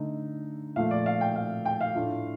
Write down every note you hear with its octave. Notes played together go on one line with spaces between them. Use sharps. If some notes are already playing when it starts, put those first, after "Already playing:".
Already playing: D3 A3 D#4
A#2 F3 A3 F5
D5
F5
G5
F5
G5
F5
A2 A3 D4 F4